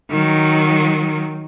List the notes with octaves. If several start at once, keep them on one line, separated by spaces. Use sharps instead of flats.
D#3 F#3